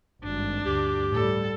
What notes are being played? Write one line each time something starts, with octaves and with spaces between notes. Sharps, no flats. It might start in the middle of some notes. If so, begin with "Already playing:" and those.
G#1 G2 D4
D2 G2 G4
A2 G3 A4